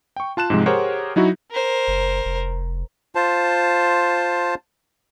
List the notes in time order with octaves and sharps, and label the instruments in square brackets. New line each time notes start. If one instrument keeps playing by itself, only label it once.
[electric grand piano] G5 C#6
F4 A5 F#6 E7
G#2 C3 F3 G#3
G4 G#4 A#4 C5 C#5 F#5
F#3 D#4 E4 F#4
[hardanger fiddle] A#4 C5
[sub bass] F#1
F1
[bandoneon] F4 C5 A5